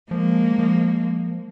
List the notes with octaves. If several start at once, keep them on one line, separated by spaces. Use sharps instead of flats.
F3 G#3 A#3
F3